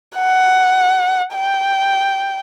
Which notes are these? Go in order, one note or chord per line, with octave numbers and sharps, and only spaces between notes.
F#5
G5